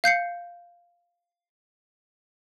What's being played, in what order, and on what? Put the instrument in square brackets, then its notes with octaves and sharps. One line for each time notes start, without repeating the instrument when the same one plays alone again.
[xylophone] F5 G6 C7 C#7